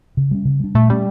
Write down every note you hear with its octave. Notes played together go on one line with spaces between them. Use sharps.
C#3
G3 C#4
C#3
G3 D4
A#2 A3
G3 A3 C#4